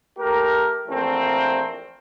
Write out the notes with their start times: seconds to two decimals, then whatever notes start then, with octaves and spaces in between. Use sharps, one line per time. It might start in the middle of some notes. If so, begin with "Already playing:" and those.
0.18 A3 G4 A#4
0.88 A#1 E3 A3 C4 A#4